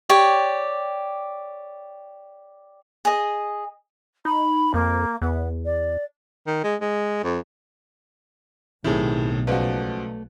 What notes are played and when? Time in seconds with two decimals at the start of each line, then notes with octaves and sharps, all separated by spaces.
0.10 G4 C#5 D5
3.05 G#4 D#5
4.25 D#4 B5
4.74 F2 A#3
5.22 E2 B3
5.65 D5
6.47 D#3
6.64 G#3
6.81 G#3
7.24 F2
8.84 B1 A2 C3 D#3 E4 G#4
9.47 C#2 F3 A3 F#4 B4 D5